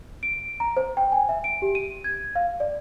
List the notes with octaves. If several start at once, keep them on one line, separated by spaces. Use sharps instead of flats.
D7
A#5
C5
G5
G#5
E5
D7
G4
D#7
G#6
F5
D5